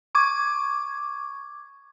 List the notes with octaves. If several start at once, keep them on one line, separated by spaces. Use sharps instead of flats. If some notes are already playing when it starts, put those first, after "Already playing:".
C#6 D6 G#6